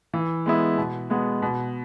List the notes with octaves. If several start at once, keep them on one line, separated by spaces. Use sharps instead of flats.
E3
G#3 B3 E4
B2
G#3 B3 F#4
B2